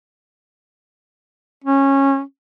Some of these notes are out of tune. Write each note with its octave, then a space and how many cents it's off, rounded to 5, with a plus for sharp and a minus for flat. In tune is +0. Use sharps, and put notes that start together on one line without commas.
C#4 -15